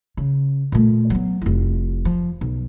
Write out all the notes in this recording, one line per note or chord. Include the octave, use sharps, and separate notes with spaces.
C#3
A#2 A3
F#3 B3
F1 E4
F3
B1